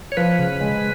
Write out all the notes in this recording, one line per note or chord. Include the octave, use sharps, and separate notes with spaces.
C#5
F3 B4
C#3
G#3